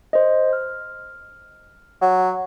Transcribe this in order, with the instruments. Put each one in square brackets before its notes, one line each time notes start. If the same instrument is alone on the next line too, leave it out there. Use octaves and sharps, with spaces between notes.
[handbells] C5 D#5
F6
[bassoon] F#3